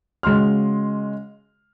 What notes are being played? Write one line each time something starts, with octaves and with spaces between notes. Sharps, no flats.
C#3 G#3 F#4 C6 F6